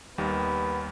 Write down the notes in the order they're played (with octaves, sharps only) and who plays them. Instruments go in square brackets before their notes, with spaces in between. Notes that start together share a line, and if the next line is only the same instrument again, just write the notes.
[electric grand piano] D#2 D#3 G3 [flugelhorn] B3